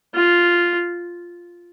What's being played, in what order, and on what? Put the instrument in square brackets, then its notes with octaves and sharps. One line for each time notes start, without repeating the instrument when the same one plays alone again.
[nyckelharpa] F4